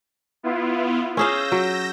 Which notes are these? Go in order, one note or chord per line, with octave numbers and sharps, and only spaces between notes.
B3 E4 F4
C#4 G#4 F5 E6 G6 A#6
F#3